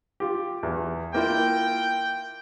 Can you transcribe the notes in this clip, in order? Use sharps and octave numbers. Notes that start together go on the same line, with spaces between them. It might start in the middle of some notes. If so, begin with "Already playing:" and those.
F4 G4
E2
A#3 E4 F4 G5